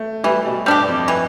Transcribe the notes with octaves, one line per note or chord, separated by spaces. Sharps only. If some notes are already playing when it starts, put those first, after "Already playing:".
Already playing: A3
E3 G3
B2
G2 G3 D4 G4
F2
E3